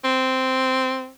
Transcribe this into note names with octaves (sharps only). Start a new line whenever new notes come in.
C4